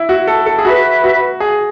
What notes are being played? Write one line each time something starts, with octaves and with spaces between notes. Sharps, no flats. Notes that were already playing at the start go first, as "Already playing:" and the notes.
Already playing: E4
F#4
A4
A4
G#4
F#4 B4 E5 B5
F#4
G#4